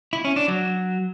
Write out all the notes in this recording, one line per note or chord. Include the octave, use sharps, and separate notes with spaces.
E4
C#4
D4
F#3